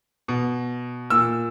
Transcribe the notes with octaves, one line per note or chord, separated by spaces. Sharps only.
B2
A#2 E6